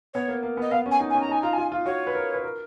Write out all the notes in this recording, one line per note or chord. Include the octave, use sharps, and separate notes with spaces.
B3 C#5
A#3
A#3
B3 D#5
B3 F5
C#4
G#5
D#4
C#4 G#5
A#5
D#4 G#5
F4 A#5
F4 G#5
F4
F#4 C#5
B4
A#4
B4
A#4